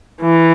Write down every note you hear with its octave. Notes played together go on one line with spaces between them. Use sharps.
E3